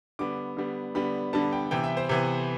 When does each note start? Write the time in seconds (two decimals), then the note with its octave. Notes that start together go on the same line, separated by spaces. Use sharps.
0.19 D3 G3 B3 D6
0.57 D3 G3 B3
0.95 D3 G3 B3 B5
1.33 D3 G3 B3 A5
1.52 G5
1.71 C3 E3 B3 G5
1.84 E5
1.97 C5
2.09 C3 E3 B3